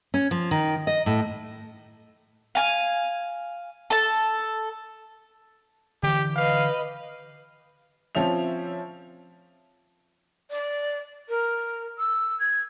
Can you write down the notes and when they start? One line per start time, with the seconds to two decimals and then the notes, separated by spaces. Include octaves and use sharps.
0.14 C#4
0.31 F3
0.51 D#3
0.87 D#5
1.06 A2
2.55 F5 G#5
3.90 A4 A5
6.03 D3 E3 G4
6.36 B4 D#5 F5
8.15 F3 C4 C#4 E5 F7
10.50 D5
11.29 A#4
11.99 E6
12.40 G#6